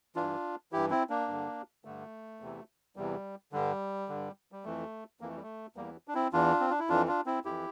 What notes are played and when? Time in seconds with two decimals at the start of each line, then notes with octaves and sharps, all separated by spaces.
0.16 G2 E3 D4 F4
0.72 G2 E3 E4 G4
0.90 C4 E4
1.10 A#3 D4
1.28 G2 D3
1.85 G2 D3 A3
2.40 E2 C3 E3
2.96 E2 C3 E3 G3
3.52 G2 D3 G3
4.09 G2 D3
4.52 G3
4.65 F2 E3 A3
5.21 F2 E3 A#3
5.29 A3
5.35 G3
5.43 A3
5.76 E2 E3 G3 A#3
6.08 D4
6.14 C4 E4
6.33 E2 E3 D4 F4
6.60 C4
6.70 D4
6.79 E4
6.89 F2 E3 D4 F4
7.08 D4 F4
7.26 C4 E4
7.45 F2 E3 E4 G4